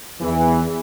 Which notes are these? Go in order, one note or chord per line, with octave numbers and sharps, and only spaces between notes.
E2 E3